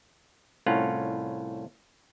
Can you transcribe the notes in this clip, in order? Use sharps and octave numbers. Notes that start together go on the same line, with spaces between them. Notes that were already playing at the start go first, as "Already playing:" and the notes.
C2 A2 C#4 F4 F#5